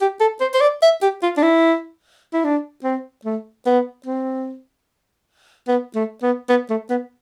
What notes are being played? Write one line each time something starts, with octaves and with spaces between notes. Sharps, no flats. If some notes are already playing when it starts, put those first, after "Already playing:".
G4
A4
C5
C5
D5
E5
G4
F4
D4
E4
E4
D4
C4
A3
B3
C4
B3
A3
B3
B3
A3
B3